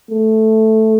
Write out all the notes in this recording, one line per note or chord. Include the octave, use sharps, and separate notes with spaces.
A3